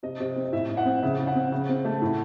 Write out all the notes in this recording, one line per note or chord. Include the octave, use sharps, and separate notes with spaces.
C3 D#5
C3
C4
D#5
A2 E5
A2
F#5
C4
C#3 E5
C#3
F#5
C4
C#3
C4
A3
A2